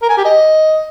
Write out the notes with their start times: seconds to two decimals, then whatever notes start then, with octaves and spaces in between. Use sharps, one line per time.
0.02 A#4
0.10 G#5
0.17 G4
0.25 D#5